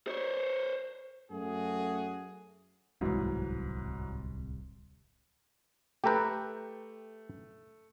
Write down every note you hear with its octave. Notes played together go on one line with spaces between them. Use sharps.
C5 C#5
F#2 A3 F#4 G#4
D1 C2 G#2 E3 F#3
A3 G4 A4 B4 G5 A#5